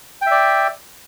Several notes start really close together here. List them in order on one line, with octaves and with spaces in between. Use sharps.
G5 E5 D5